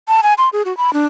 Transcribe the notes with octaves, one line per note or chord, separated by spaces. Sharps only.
A5
G#5
C6
G#4
F#4
B5
D4